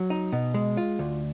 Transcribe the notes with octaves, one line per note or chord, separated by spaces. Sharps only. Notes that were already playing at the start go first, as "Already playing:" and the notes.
Already playing: F#3
D#4
B2
G#3
F4
D2